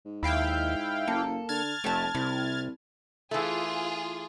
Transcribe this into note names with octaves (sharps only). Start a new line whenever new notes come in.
G#2
D#2 E4 F5 G5
F#1 A#3 A4
D3 F6 G#6 A6
F1 A3 G4 A5
C2 C3 E4
E3 A3 F4 G#4